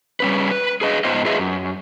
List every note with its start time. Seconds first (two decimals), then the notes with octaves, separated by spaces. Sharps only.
0.20 G3 C#4 B4
0.51 B4
0.81 G#4 B4 D#5
1.04 G#2 B3 F4 C5 D#5
1.25 F4 G#4 B4 D#5 E5
1.39 F#2